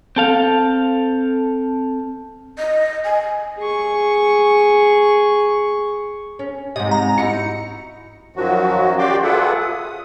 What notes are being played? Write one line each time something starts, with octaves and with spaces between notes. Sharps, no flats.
C4 A4 F5
D#5
G#5
G#4 C#6
C#4
G#2 C3 D#5
A#5
D#4 E4 F#4 C#7
F#2 D#3 F3 F#3 F#4
F#4 G4 D5 G5 C6 D6
F4 G#4 A4 B4 E5 F#5
D#6